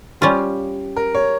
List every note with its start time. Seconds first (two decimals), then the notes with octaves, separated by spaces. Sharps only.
0.21 G3 C#4 F4 G4
0.96 A#4
1.15 C#5